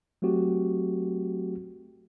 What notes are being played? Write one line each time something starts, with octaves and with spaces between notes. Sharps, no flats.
F#3 A3 C4 F#4 G4